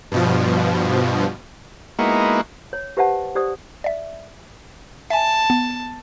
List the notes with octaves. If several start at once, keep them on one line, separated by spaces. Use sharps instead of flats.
G2 B2 F3
G#3 A#3 B3 D#4 E4 F#4
C#5
G4 B4 C5 E5 F#5 A5
G4 C5 D5 D#6
D5 E5
E5 G#5 A5
B3